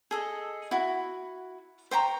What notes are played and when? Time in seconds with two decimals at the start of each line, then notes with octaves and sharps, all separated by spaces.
0.11 G#4 A4 D#5
0.71 E4 F#4
1.91 C5 G5 A#5 C#6